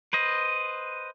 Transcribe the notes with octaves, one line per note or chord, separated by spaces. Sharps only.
B4 C5 D#5